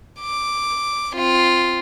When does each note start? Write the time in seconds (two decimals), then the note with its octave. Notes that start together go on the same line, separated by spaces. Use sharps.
0.20 D6
1.14 C4 F4